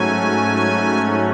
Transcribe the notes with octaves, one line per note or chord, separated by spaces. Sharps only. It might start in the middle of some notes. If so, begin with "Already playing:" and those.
Already playing: G#2 F#3 A3 C#4 G#5